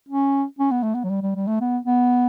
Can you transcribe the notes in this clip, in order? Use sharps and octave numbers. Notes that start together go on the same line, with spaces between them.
C#4
C#4
B3
A3
B3
F#3
G3
G3
G3
A3
B3
B3